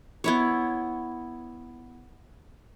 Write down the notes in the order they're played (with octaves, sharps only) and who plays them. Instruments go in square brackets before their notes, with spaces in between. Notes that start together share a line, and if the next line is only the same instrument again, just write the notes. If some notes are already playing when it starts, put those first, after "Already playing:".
[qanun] B3 E4 C#5